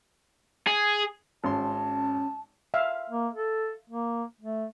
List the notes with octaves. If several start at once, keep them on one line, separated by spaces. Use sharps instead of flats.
G#4
G#1 C#4 A5 C6
E5 F5
A#3
A4
A#3
A3